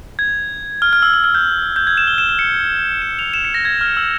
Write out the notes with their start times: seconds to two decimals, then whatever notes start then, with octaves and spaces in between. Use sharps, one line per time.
0.19 G#6
0.82 F6
0.93 F6
1.03 E6
1.14 E6
1.24 F6
1.35 G6
1.76 G6
1.87 G#6
1.97 E7
2.07 G7
2.18 E7
2.29 E7
2.39 C#7
3.02 E7
3.19 F7
3.34 E7
3.45 C#7
3.54 A#6
3.65 G#6
3.81 F6
3.97 E6